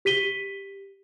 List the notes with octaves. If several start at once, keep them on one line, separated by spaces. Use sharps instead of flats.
G4 B6 D#7 G7